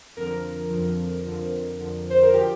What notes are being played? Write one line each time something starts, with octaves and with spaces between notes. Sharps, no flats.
F2 D3 F3 A#4
F2 D3 F3
F2 D3 F3
F2 D3 F3
C5
A#4
D3 F3 G4